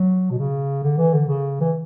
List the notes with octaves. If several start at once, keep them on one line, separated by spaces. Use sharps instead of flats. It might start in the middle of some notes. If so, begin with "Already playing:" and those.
Already playing: F#3
B2
C#3
D3
E3
D3
C#3
E3